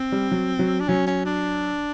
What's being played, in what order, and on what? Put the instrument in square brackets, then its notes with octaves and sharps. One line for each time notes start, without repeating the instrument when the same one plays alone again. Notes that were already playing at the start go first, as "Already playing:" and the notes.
Already playing: [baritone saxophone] C4
[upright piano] G3
F#3
F#3
[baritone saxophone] D4
[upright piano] F#3 [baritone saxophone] C#4
[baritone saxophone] C#4
D4